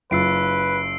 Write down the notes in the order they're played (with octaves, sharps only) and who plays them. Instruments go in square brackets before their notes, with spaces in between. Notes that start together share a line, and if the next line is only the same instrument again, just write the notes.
[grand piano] F#1 F4 [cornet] B4 [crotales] E6 C7 D7